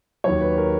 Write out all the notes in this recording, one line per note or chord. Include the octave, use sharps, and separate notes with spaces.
D#2 D#3 F#3 C#5
B4
A#4